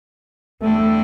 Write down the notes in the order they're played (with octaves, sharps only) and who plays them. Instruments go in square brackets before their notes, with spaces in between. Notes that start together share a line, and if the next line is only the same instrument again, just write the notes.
[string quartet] E2 D3 G3 D4 [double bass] A3